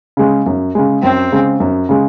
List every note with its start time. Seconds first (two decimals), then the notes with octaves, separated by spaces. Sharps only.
0.17 C#3 G#3
0.46 F#2
0.75 C#3 G#3
1.03 F#2 C4
1.32 C#3 G#3
1.60 F#2
1.89 C#3 G#3